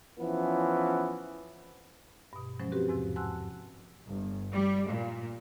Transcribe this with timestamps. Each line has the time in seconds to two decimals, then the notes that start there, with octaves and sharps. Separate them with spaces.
0.19 E3 F3 B3 C#4
2.33 G2 B2
2.59 F3 F#3 G#3 C#4 C5
2.72 C4 F#4 G4 A#4 B4
2.89 E2 G#2 C3 F3
3.16 F#5 G#5 A5 C6 E6 F#6
4.07 G1
4.53 G3
4.88 A#2